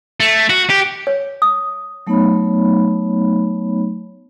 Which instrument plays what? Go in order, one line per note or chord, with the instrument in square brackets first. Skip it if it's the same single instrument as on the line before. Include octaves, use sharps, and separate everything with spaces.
[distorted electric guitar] A3
F#4
G4
[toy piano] C#5
D#6
[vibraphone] F#3 A3 B3 D#4 C#5 B5